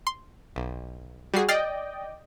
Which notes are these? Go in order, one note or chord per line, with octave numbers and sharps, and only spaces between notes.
C6
B1
G3 F#4 G#4 C7
D5 D#5 G5 F6 A6 C7